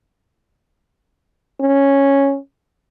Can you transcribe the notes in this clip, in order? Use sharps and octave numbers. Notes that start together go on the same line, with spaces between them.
C#4